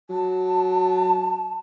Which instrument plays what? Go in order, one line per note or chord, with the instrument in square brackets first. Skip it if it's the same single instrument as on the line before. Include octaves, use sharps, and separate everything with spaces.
[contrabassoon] F#3 [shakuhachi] A5